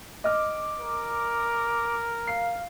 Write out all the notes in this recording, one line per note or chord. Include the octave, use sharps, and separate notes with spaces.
D#5 D6 F6
A#4
F5 C7